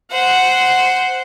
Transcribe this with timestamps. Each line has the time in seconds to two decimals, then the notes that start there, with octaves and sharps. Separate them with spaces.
0.12 C5 F#5